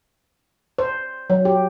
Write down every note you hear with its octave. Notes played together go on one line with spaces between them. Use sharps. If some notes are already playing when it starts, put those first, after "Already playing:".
C5
F#3
G4